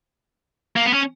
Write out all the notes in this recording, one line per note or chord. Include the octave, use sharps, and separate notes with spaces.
A#3
B3
C#4